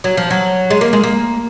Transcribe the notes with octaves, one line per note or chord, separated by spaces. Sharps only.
F#3
F3
F#3
G#3
A#3
G#3
A#3